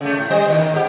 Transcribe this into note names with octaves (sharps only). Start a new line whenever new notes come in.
C#3 A3
A2
G3 C5 D#5
D#2 B2 E3
D#3
G#2 C#4 G4